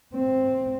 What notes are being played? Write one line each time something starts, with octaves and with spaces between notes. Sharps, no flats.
C4